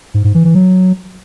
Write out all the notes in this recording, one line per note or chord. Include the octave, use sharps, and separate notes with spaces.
G#2
G#2
E3
E3
F#3